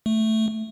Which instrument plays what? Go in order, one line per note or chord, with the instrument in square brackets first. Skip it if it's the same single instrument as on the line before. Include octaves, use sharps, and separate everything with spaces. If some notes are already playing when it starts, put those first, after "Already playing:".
[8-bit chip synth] A3